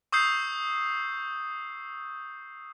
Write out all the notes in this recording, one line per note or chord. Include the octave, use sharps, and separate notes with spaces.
C#6 D#6 E6 G6 C7